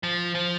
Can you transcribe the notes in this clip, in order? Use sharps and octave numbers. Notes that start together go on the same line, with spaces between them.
F3
F3